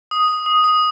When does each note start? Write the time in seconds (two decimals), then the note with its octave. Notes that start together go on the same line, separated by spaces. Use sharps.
0.11 D#6
0.28 D#6
0.46 D#6
0.64 D#6